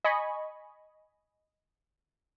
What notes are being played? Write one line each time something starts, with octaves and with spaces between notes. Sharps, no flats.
D#5 G#5 B5 C#6